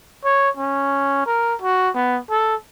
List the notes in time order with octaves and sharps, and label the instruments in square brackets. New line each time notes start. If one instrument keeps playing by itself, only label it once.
[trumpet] C#5
C#4
A#4
F#4
B3
A4